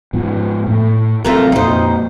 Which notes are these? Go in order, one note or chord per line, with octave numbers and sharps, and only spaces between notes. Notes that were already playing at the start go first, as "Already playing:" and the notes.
G#2 F3 B3
A2
C2 F#3 A3 C4 F4 A#4
F2 A#2 D#4 C5